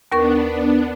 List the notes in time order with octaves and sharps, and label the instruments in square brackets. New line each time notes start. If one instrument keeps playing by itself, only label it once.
[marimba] D#2 A#4 C#6 [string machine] B3 D4